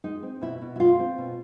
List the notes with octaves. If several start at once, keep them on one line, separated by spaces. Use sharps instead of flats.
G#3 D#4
C4
B2 E4
B2
E4
G#3 F4
C4
B2